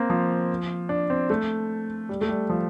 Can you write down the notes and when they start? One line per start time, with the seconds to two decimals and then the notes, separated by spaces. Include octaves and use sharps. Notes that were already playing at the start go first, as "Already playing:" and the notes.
Already playing: A#3 C4
0.10 F3
0.89 D4
1.10 C4
1.30 A3
2.09 G3
2.21 A3
2.29 G3
2.50 F3